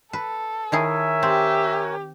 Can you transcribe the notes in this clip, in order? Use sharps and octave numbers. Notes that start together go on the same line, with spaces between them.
A4 B4
D#3 E4 G#4 A#4 C#5 E5 G#5
C4 G4